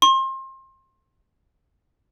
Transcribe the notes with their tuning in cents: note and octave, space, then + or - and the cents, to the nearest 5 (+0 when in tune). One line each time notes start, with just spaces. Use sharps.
C6 +30